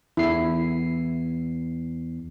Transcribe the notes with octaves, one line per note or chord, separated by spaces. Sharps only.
E2 E4 C7